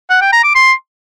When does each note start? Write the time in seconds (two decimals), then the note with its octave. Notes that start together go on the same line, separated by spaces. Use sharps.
0.10 F#5
0.21 G5
0.32 A#5
0.44 D6
0.55 C6